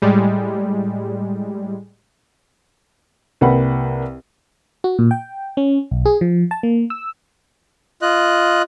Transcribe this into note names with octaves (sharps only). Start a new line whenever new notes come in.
A2 G3 G#3
C2 A#3 B4 F#5 G5 B5
F#4
A#2
G5
C#4
B1
G#4
F3
A5
A#3
E6
F4 D#5 F#6